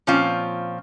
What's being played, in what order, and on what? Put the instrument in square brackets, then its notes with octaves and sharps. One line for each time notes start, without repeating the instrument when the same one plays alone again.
[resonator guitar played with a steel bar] A#2 F3 C4 C#4 F4